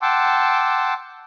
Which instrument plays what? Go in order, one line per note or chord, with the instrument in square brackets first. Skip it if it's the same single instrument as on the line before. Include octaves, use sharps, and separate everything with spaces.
[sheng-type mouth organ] F#5 G5 A5 C6 D6 E6